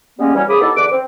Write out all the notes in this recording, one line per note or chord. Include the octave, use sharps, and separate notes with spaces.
G3 G#3 A#3 B3 C#4
E3 F#3 G3 C#4
C2 C#3 G#4 B5 D6 D#6
B3 D#4 E4 G4 A4
E2 D3 B4 D6
C4